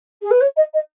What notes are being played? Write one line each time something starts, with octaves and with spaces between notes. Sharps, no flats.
G#4
B4
C#5
D#5
D#5